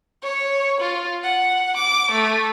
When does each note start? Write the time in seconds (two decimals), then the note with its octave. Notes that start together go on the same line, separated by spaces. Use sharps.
0.23 C#5
0.81 F4
1.24 F#5
1.77 D6
2.12 A3